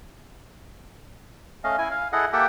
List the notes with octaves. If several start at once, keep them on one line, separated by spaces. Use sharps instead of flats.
A3 C#4 D#5 F5
E4 G#5
F5
E4 G#4 A4 D#5 F#5
A#3 G4 A4 E5 F#5 G5